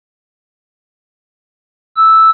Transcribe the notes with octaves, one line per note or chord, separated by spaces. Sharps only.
E6